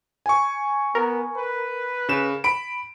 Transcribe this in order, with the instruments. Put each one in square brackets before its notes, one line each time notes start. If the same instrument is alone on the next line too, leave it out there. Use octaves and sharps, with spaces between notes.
[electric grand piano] G#5 C#6
[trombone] B3 [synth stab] A#4
[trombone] B4
[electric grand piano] C#3 E7
B5 D7